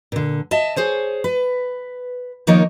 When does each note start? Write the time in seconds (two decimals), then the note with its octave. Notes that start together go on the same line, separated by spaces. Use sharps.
0.12 A#2 D3
0.51 D#5 E5 A5
0.76 G#4 C5 C#5
1.24 B4
2.47 D#3 F3 A#3 D#4 A#4 C#5